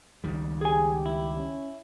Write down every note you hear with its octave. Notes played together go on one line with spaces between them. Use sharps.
C#2 D#3 G3
G4 G#4 G#5
E4
C#4